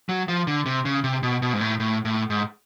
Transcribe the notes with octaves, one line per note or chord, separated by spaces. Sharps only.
F#3
F3
D3
C3
C#3
C3
B2
B2
G#2
A2
A2
A2
G#2